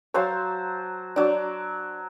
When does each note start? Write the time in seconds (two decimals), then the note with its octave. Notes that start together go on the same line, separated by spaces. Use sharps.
0.14 F#3 C5 C#5 F5 A5
1.16 F#3 D4 D6